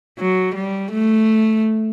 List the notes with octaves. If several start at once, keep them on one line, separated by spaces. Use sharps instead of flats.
F#3
G3
A3